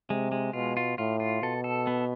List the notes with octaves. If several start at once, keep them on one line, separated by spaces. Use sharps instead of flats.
C3 G#3
G#3
B2 F4
F4
A2 F4
F4
B2 A4
A4
B3